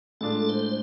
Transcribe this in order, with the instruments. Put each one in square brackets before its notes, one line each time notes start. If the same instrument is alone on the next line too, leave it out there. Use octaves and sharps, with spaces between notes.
[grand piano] A2 G#3 D4 F4 [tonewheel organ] A4
[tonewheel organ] C5